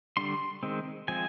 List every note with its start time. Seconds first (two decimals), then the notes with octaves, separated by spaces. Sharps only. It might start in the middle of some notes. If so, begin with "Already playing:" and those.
0.17 D3 G3 D4 C6
0.63 D#3 G#3 C4
1.08 F3 G#3 C4 G#5